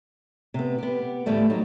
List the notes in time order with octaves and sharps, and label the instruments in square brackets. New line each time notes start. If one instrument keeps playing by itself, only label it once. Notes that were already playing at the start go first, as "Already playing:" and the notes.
[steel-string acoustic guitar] C3 B3
B3 G4
D2 A2 E3 G3 A3 B3
F#3 D#4